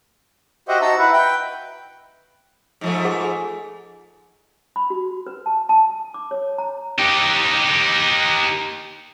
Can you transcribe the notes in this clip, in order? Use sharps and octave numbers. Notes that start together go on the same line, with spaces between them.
F#4 G4 C5 D#5 E5 F#5
D#4 F#4 A5 A#5 E6
E4 B4 E5 F#5
B4 G5 G6
G#2 F3 A3
G#4 F#5 G#5
B5
F#4
B4
A5
A5
D6
C#5
A#5
D#4 G4